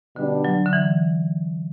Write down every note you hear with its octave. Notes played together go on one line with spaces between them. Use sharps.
B2 D3 G3 D4
F#3
D3
E3